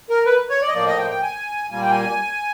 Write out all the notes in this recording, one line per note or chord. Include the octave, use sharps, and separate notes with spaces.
A#4
B4
C#5
D5
D#5
A2 F3 A#3 D5
D#5
G5
G5
G#5
A#2 G3 A#3 G#5
G5
G#5